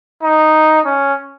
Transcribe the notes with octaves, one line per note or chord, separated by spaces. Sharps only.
D#4
C#4